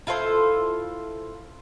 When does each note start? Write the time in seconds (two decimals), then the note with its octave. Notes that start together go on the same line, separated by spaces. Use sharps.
0.07 E4 F4 A4 C5